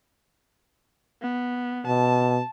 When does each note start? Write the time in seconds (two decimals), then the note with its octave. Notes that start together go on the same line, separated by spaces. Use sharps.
1.22 B3
1.87 B2 A5